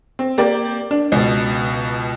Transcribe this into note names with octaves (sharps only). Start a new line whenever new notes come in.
C4
A#3 G4 D5
D4
C#2 B2